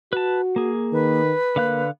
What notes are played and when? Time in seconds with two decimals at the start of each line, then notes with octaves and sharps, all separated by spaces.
0.13 F#4 B4 A5
0.56 A#3 G#4
0.93 D#3 B4
1.56 D3 A#3 F5 F#6